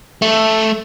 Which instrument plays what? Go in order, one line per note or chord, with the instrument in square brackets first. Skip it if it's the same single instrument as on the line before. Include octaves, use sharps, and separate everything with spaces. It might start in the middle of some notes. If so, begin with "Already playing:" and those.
[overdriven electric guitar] A3